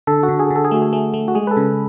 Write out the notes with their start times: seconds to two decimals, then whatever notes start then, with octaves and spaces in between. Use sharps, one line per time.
0.07 D3 A4
0.23 F#4
0.29 D3
0.39 G#4
0.50 D3
0.56 A4
0.65 G#4
0.71 A3 F#4
0.82 G#4
0.93 A3
1.14 A3
1.28 F#4
1.35 G#3 G#4
1.47 B4
1.51 A4
1.57 C#3